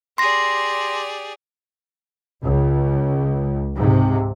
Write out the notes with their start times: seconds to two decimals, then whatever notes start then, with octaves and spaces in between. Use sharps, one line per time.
0.18 G4 G#4 D5 C6 A#6
2.43 C#2
3.76 G#2 C3